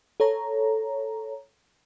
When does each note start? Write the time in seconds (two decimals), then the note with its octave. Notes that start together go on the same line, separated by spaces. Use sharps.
0.20 A4 C#5 A#5